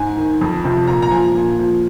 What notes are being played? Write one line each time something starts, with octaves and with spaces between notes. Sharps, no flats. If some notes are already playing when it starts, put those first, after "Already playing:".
Already playing: G#2 G#5
D#3
F2
C3 F3
A#2 A#5
A#5
F3 G#5
A#2
F3